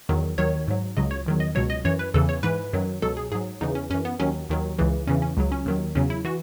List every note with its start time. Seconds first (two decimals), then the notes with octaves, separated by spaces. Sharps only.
0.09 E2 D#3 F#3
0.38 D#2 D#3 F#3 C#5
0.68 G#2 F#3
0.97 C#2 C#3 F#3 D#5
1.11 C#5
1.26 E2 D#3 F#3
1.40 D#5
1.55 C#2 B2 F#3 C#5
1.70 D#5
1.85 F#2 E3 C#5
1.99 B4
2.14 E2 C#3 E3 A4
2.29 C#5
2.43 G#2 E3 B4
2.73 F#2 D#3 F#3
3.02 C#2 B2 F#3 A4
3.17 G#4
3.32 G#2 F#3 G#4
3.61 E2 C#3 E3 D#4
3.75 C#4
3.90 F#2 E3 C#4
4.05 B3
4.19 D#2 D#3 F#3 C#4
4.49 D#2 D#3 F#3
4.79 C#2 C#3 E3
5.07 E2 C#3 E3 C#4
5.22 C#4
5.37 C#2 C#3 F#3
5.52 C#4
5.66 D#2 D#3 F#3
5.95 E2 C#3 F#3 C#4
6.10 E4
6.25 E3 F#4